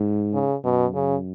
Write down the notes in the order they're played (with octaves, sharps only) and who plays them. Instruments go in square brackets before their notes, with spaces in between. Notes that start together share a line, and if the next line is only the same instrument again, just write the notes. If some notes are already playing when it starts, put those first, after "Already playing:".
Already playing: [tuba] G#2
[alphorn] C#3
[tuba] F#2 [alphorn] B2
[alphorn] C#3